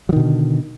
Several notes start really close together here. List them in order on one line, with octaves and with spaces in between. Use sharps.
F#3 D#3 B2 D3